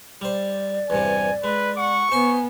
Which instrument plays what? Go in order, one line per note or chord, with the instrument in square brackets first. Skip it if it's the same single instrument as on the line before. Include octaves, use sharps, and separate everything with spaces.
[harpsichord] G3 C5 [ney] D5
[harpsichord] E2 G2 C3 [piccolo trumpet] G#5
[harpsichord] G#3 [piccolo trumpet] B4
[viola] F#5 [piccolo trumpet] C#6
[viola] B3 [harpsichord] C5 C6 [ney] G#5